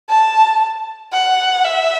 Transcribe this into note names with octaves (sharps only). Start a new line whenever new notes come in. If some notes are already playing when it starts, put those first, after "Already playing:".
A5
F#5
E5